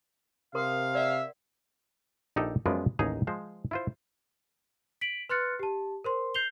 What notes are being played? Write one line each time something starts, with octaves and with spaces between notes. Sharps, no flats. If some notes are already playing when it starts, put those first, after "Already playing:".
C3 A#4 F5 C6 D#6
D5 E5 F#5
A#1 D#4 G4 A4
F#2 F3 G#3 B3 B4 D5
A1 D#2 D#4 G#4 A#5
F3 G#3 C5
E4 F4 C5
B6 D7 F#7
B4 C6 F6 F#6 A6 C#7
G4 A5
A#4 C5 C6
G6 C7 F7 G7